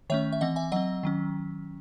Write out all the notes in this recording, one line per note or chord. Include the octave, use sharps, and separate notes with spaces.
D#3 A3 C#4 C#5 E5
E5
E3 C4 D#5 F#5
E5 G#5
F#3 C4 D#5 F#5
D#3 F#3 C#4